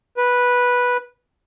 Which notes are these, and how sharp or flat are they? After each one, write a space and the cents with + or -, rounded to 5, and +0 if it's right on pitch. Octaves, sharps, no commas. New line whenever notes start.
B4 -10